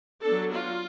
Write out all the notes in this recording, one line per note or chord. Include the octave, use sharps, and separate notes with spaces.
F#3 B3 D4 A4
F4